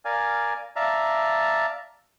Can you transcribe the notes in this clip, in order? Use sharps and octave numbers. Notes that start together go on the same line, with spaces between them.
A#4 D5 F5 G#5
D5 E5 F5 A5 A#5